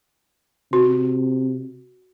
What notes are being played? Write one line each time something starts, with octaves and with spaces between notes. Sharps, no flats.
C3 F#4